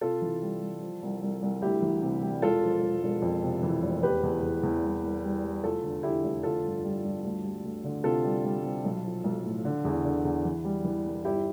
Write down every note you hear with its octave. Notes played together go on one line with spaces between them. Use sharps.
C3 F4 A4
E3
G3
G3
F3
C2
C2
C2
D2 E4 G4
E3
C3
G3
E1 F4 A4
F3
E1
E1
F2
C3
E3
F1
E2 G4 B4
E2
E2
E2
C2
C2
G3
G3
F1 F4 A4
D3
D3 E4 G4
F1
D3 F4 A4
G1
G3
G2
D2
G3
D2
D3
C3 F4 A4
G3
G3
C3
B1
F3
B1
A2
D3
E2
D3
E2
E3
G3
E3
C2
G1 E4 G4